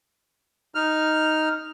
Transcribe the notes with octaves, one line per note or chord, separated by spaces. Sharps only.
D#4 F6